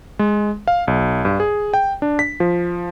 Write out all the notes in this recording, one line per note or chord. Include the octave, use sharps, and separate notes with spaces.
G#3
F5
B1
G2
G#4
G5
D4
B6
F3